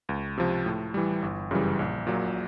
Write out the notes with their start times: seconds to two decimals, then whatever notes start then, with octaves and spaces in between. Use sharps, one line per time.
0.09 C#2
0.38 C3 F3
0.66 A2
0.94 E3 G3
1.22 G1
1.51 F#2 C#3 E3 G3
1.79 A#1
2.07 A#2 F#3